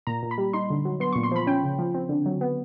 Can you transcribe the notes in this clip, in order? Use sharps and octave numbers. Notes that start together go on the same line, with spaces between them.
A#2 A#5
A#2
B5
G3
D#4 C6
D3
F#3
B3 C6
A#2 C#6
C6
F3 B5
C#4 G5
C#3
F3
C4
D3
F#3
B3